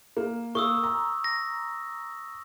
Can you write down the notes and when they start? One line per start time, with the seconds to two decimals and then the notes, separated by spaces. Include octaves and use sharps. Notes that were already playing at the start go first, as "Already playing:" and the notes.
0.17 A#3
0.55 A#3 C#6 D#6 E6
0.83 A#5
1.24 A#6